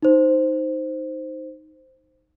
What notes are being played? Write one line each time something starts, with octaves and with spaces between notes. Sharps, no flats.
D#4 C5